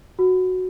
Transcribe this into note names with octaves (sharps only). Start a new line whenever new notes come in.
F#4